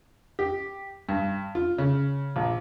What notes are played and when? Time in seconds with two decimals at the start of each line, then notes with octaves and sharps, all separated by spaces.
0.39 G4
1.09 G2
1.55 F4
1.78 C#3
2.36 A#1